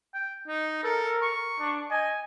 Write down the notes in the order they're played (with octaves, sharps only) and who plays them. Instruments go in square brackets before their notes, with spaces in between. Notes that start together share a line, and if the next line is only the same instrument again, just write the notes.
[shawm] G5
D#4
[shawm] A4 [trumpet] A#4
[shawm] C#6
[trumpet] D4
[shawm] D#5 [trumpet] G#5